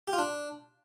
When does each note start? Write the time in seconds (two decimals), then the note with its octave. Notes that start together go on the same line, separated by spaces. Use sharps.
0.08 G4
0.13 F4
0.18 D4